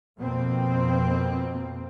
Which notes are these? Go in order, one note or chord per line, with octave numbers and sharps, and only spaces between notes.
F2 B2 A#3 C4